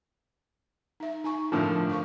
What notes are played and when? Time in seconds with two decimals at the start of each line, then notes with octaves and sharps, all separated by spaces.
1.00 D#4 E5
1.24 D#4 G#5 C#6
1.52 A2 D3 F3 C4 A4 A#4
1.90 F5 C#6